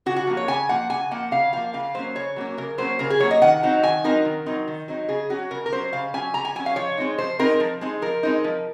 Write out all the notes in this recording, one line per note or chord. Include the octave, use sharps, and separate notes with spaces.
C#3 F#4
F#4
F3 A#3
C#5
C#3 G#5
F3 A#3 F#5
C#3 G#5
F3 A#3 F#5
C#3 F5
F3 A#3 F5
C#3 F5
F#3 A#3 C#4 C5
C#3 C#5
F#3 A#3 C#4
C#3 A#4
F#3 A#3 C#4 C5
C#3 A#4
G#4
F#3 A#3 C#4 C#5
D#5
D#3 F#5
F#3 C4 D#4
D#3 G#5
F#3 C4 D#4 A#4
D#3
F#3 C4 D#4
D#3
F#3 C4 D#4
C#3 G#4
F#3 C#4 F#4
C#3 A#4
A#4
F#3 C#4 C5
C#3 F5
F#3 C#4 G#5
C#3 A#5
G#5
F#3 C#4 G#5
F5
F3 C#5
G#3 C4 D#4
F3 C5
G#3 C4 D#4 A#4
F3
G#3 C4 D#4
F3 A#4
G#3 C4 D#4
F3